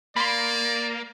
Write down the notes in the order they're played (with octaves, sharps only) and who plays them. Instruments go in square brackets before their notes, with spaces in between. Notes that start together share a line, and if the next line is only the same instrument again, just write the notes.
[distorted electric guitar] A#3 [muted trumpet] D5 [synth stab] B5 C6